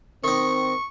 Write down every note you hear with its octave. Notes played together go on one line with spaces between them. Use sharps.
D#3 C4 D#4 C#6